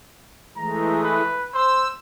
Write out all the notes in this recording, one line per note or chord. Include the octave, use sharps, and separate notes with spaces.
E3 G#3 A3 A#5
B4
C5 E6